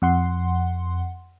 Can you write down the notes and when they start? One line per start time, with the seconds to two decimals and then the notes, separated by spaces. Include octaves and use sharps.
0.02 F2 F#5 C6